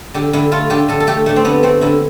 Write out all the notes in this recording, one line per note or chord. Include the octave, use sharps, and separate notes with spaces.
D3 G4
D3 E4
A3 F4
D3 G4
D3 A4
A4
A3 G4
A3 D4
C4
D3 B3
A3 C4
D3 E4